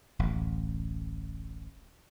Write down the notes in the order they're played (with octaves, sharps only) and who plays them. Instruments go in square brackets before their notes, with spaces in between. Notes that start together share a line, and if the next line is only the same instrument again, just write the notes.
[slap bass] D1 A1